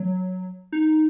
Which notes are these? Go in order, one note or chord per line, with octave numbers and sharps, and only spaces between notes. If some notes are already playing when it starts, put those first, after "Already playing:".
Already playing: F#3
D#4